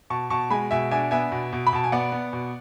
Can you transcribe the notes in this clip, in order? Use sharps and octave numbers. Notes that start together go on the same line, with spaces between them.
B2 A5 C#6
B2 A5 C#6
G#3 G#5 B5
B2 E5 G#5
D4 E5 G#5
B3 E5 G#5
B2
B2
B5
B2 A5
G#5
B3 D5 F#5
B3
B2